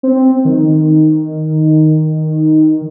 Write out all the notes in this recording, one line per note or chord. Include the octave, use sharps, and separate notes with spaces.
C4
D#3